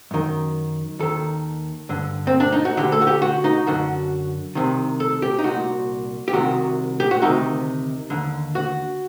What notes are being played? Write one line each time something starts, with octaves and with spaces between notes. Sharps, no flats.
F#2 D#3
D#2 D#3 A4
G2 D3
C4
D4
D#4
F#4
D2 D3 G4
A4
F#4
G4
F#4
D#4
F#2 D3 F#4
C2 C3 D#3
A4
G4
D#4
C2 A#2 F#4
G4
C2 C3 D#3 F#4
G4
F#4
D2 C3 D#3 D#4
D#2 D3
F#4